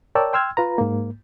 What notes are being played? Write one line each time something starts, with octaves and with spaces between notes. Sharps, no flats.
A#4 C#5 D5 G5 A5 E6
G5 C6 E6 F6 G#6
F4 B4 A#5
G#2 A#3